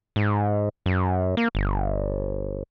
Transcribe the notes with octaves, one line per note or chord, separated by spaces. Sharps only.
G#2
F#2
A#3
G1